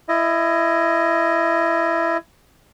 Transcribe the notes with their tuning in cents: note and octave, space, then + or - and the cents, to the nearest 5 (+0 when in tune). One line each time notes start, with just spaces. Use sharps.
E4 +20 D#5 +0